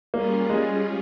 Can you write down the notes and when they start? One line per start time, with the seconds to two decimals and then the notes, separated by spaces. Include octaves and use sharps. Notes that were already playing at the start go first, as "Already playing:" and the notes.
0.14 G3 A#3 C#4 F4 G#4
0.50 G#3